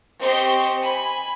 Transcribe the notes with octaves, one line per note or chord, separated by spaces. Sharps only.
C4 G4 C5 D#5 C#6
G#5 B5